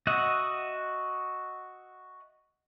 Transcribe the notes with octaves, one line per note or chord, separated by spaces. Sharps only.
F#4 D#5 E5 F#5